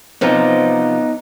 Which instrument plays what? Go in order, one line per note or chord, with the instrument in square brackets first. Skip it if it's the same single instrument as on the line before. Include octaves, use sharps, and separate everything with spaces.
[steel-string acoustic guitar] C3 F3 [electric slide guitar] B3 D#4